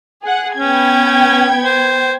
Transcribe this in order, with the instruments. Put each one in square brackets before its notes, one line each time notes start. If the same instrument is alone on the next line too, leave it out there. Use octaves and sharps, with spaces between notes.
[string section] G#4 F#5
[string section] B3 G5 G#6 [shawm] C#4
[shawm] C5